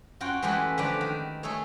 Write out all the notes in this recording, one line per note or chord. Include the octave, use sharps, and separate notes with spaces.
F#2 F4 F#4 G5
E3 G#3 A3 G4 B4
D3 F3 A3 G4 B4 D5
D#3
A3 G#4 A4 C#5